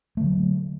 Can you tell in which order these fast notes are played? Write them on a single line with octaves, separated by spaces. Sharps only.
A3 D3 F#3